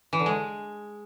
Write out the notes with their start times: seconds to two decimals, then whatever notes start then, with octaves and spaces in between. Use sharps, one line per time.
0.13 E3
0.19 D3
0.26 G#3